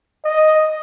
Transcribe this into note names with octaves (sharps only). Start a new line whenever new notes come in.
D#5